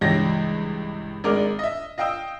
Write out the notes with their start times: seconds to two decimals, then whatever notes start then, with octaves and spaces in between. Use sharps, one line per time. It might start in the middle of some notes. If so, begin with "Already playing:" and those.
0.01 C#2 G2 E3 G4 C#5 A#6
1.24 G#1 G#3 A#4 D5 D6 F6
1.59 D#5 E5
1.98 D#5 F5 G5 D#6 E6